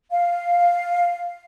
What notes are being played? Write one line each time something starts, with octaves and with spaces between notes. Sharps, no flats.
F5